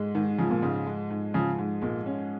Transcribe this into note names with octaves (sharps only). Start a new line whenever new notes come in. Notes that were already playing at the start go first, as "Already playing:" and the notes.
Already playing: G#2 G#3
G#2 D#3
C#3 F3
A#2
G#2 C#3
G#3
G#2
C#3 F3
G#2
A#2 G#3
C#4